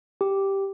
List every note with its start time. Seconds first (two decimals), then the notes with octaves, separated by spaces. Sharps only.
0.21 G4